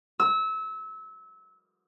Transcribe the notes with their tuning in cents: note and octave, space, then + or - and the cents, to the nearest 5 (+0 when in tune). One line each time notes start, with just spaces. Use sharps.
E6 -25